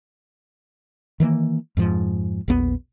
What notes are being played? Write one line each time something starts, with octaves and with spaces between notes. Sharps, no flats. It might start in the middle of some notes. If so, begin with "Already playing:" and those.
D#3 E3 G#3 A#3
F2 G#2 F3
A#1 E2 B3